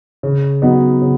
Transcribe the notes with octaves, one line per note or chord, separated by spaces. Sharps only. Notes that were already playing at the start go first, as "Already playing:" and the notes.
C#3
F#3 B3 D#4
C#3